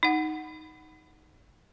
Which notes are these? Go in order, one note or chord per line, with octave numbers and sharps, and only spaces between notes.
D#4 F#5